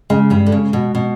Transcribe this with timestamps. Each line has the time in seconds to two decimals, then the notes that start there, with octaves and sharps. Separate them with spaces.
0.10 C#3 G#3
0.30 G2 G3
0.46 D3
0.52 C#3
0.73 B2
0.95 B2